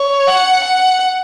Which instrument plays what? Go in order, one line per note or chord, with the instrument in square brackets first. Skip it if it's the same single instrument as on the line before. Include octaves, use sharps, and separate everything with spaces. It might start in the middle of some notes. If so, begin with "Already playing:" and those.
Already playing: [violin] C#5
F#5
F#5